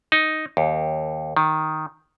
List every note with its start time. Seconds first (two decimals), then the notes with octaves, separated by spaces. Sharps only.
0.12 D#4
0.57 D#2
1.37 D#3